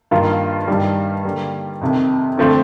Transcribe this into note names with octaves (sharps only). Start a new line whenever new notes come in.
G2 D#3 A#3 F4
G2 D#3 G3
D3 G3 A#3
F2 C3 D#3
D3 F3 A3 C4